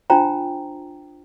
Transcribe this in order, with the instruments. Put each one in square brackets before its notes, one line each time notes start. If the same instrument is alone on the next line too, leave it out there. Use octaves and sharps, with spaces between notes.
[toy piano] D4 F4 C5 G5 A#5